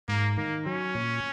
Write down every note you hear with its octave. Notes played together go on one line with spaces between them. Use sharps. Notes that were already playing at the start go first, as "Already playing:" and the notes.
G#2 A#3
D#3 A#3
F#3 C#4
A#2